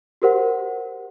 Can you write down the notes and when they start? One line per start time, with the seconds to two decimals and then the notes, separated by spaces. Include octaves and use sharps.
0.22 F#4 G4 A#4 C5 F#5